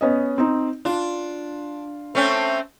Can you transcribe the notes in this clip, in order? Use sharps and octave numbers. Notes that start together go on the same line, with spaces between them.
B3 C#4 D#5
C4 D#4
D4 F4
A3 C4 C#4